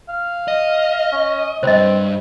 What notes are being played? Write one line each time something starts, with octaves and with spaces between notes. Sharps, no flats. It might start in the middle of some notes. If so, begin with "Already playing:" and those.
F5
D#5
C#4
C#2 G2 C4 C5 D#5